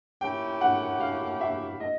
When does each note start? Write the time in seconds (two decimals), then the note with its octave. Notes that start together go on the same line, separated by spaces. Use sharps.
0.21 F3 A#3 C#4 E4 G4 G5
0.61 F#5
1.00 F5
1.41 E5
1.80 D#5